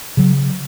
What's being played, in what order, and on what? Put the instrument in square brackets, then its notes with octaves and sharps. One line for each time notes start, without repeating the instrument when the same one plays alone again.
[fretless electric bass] C#3 F#3